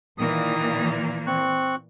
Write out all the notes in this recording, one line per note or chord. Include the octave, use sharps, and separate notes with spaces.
A#2 D#3 E3 A#3 D#6
C4 C#6 F#6